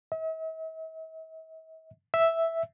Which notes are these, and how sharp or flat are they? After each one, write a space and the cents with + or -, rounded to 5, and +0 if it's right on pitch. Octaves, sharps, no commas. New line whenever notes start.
E5 -45
E5 +0